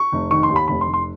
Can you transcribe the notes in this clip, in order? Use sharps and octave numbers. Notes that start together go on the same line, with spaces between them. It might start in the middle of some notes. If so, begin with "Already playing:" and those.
Already playing: C#6
F1
D#3 C#6
C6
D#2
B5
F1 B5
C6
F1
C6